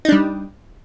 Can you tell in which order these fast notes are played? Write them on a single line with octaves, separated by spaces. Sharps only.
D#4 D4 G3